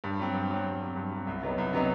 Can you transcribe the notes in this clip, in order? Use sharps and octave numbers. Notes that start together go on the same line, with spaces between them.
G2
F#3 C4
G2
F#3 C4
G2
F#3 C4
G2
F#3 C4
C2
C3 F#3 B3 D#4
C2
C3 F#3 B3 D#4